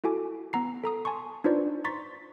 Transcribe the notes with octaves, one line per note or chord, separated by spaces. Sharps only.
E4 F#4 A4 G#5 D6
B3 F#5 A#5 C7
A4 A#5 D#6
G#5 A5 C6 C#6
D4 D#4 F4 B4 C5 D5
A#5 C6 C#6 A6 B6